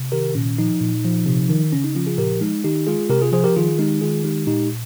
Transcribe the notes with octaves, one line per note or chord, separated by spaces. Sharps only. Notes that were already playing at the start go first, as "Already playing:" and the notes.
Already playing: C3
D#3 G4 A#4
A#2 C#4
F3 D#4
A#2
F3
C3
D#3
C#3 C#4
D#4
F3 C#4 F4
F4 G#4
A#2 G4 A#4
G#3 D#4
D#3 D#4 G4
G#3 F4 G#4
C3 G4 A#4
F4 G#4
F3 G#4 C5
G4 A#4
D#3 F4 G#4
G#3 D#4 G4
D#3 F4 G#4
G#3 D#4 G4
A#2 D#4 G4